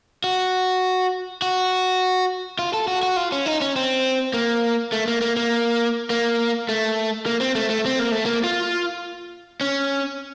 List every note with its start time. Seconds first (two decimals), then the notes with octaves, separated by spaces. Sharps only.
0.24 F#4
1.42 F#4
2.59 F4
2.73 A4
2.88 F#4
3.03 F#4
3.17 F4
3.32 C#4
3.46 D#4
3.62 C#4
3.76 C4
4.34 A#3
4.92 A3
5.08 A#3
5.22 A#3
5.37 A#3
6.10 A#3
6.69 A3
7.26 A#3
7.41 C4
7.55 A3
7.70 A3
7.86 C4
7.99 A#3
8.12 A3
8.26 A#3
8.44 F4
9.61 C#4